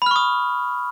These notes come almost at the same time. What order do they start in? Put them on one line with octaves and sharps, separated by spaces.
B5 F6 C#6 D#6